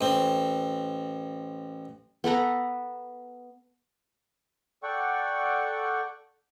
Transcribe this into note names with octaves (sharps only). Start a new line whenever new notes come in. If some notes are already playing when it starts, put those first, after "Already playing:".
A1 C4
B3 A4 B4 A#5
A4 D5 F#5 G5 C#6